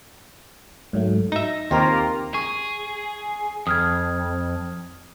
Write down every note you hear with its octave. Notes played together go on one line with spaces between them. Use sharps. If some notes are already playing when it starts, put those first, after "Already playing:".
G#2 F#3 A3
D#4 E5 A#6
D#2 A#3 C4 F4 G4 A#4
G#4 C#6
F2 D#6 F6 G#6